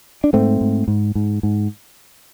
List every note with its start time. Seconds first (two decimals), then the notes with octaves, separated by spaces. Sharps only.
0.24 D4
0.33 G#2 A3 C4
0.61 G#2
0.88 G#2
1.15 G#2
1.43 G#2